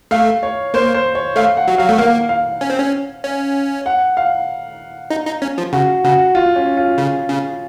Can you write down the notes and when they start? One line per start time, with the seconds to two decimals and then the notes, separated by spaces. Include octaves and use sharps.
0.11 A3 F5
0.43 C#5
0.74 A#3 C5
0.94 C5
1.15 C#5
1.36 A3 F5
1.57 F#5
1.68 F#3
1.78 F#3 F5
1.89 A3
1.98 A#3 F5
2.29 F5
2.61 C#4
2.70 C4
2.78 C#4
3.24 C#4
3.86 F#5
4.17 F5
5.10 D#4
5.26 D#4
5.42 C#4
5.58 F3
5.73 C#3 F#4
6.04 C#3 F#4
6.35 F4
6.56 C#4
6.77 F4
6.98 C#3
7.29 C#3